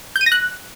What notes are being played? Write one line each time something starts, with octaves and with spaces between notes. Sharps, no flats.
G6
D#7
A#6
F#6